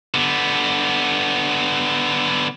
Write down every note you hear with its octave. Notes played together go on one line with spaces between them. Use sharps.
D3 B3